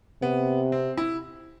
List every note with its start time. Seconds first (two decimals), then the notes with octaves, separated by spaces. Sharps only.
0.22 C3 B3
0.72 C4
0.97 E4